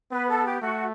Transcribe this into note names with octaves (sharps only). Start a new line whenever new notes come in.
B3 B4
A4
G4
A3 F#4